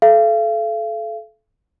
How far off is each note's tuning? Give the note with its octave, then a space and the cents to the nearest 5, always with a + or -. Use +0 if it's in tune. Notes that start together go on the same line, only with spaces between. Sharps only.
A4 -30 F5 -40